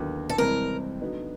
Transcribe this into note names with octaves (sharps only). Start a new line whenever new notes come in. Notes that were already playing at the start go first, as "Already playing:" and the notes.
Already playing: D#2 D3 F#3 B3
A4
C2 C3 E3 G#3 C4 A#4
D3 F#3 B3 D#4